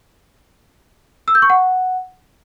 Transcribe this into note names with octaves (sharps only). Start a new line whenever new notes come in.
E6
G6
C#6
F#5